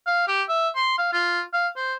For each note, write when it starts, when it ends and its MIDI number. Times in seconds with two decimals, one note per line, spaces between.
0.07 0.25 77
0.28 0.43 67
0.49 0.69 76
0.76 0.95 84
0.98 1.10 77
1.13 1.42 65
1.53 1.68 77
1.76 1.94 72